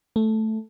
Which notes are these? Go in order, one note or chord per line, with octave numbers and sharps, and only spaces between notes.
A3